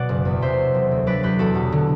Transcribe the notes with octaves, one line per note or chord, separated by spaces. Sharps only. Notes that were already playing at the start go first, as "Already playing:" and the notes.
Already playing: B2 F#3 D5 F#5
F#1
E2
C3 C5 E5
F#3
E1
D2
F#3 B4 D5
E2 G4 B4
E2 F#4 A4
B2
D3